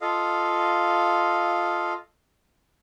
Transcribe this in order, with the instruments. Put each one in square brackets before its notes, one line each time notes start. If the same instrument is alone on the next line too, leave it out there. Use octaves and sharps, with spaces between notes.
[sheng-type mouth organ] F4 A4 D#5 F5